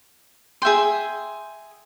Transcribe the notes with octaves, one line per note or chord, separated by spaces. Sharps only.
G#4 E5 G5 C6